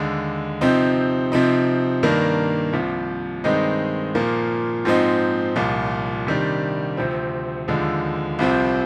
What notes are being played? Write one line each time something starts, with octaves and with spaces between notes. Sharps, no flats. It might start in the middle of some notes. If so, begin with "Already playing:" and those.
Already playing: D#2 D3 G#3
C3 F3 C4 D#4
C3 F3 C4 D#4
G2 D#3 A#3 D4
C2 C3 F3
G2 D#3 G#3 C4 D#4
A#2 F3 A#3
G#2 F3 C4 D#4
C2 A#2 F3
C3 D#3 G3 D4
D2 C3 F3 C4
D#2 D3 F3 G#3
C2 C3 F3 C4